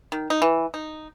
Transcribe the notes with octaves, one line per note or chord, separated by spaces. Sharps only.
D#3
D#4
E3
D#4